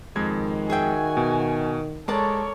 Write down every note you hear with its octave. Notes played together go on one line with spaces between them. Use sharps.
F2 D#3 G#3 G#6
F#4 G#4 E5 G5 G#5
B2
G#3 A4 A#4 C#5 D5 A5